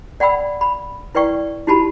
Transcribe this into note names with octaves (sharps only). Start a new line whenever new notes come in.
D5 F#5 G5 B5 E6
B5
E4 B4 D5 G5 C#6
D#4 E4 F#4 G4 A5 B5